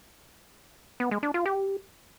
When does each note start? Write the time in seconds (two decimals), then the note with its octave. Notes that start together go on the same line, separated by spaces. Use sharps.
1.00 B3
1.11 G#3
1.23 D4
1.34 F4
1.46 G4